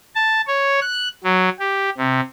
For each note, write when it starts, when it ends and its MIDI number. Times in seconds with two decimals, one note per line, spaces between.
0.15 0.41 81
0.47 0.79 73
0.81 1.08 90
1.24 1.49 54
1.59 1.89 67
1.97 2.21 48